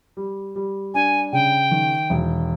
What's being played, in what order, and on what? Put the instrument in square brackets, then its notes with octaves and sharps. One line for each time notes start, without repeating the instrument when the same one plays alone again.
[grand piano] G3
G3
[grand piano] D4 [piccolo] G#5
[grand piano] C#3 [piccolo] G5
[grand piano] D#3
E1